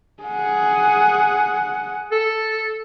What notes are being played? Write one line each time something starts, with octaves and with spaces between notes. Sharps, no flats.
G#4 F#5
A4